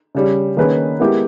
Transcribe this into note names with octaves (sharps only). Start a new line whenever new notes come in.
C#3 G3 C#4
D#3 A#3 C#4 G#4 B4
G#3 B3 E4 G4 A#4